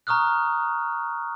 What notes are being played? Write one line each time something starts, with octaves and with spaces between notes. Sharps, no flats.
A#5 C#6 D#6 F6 F#6